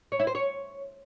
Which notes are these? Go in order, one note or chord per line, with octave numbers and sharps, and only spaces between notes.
C#5
E4
C5
C#5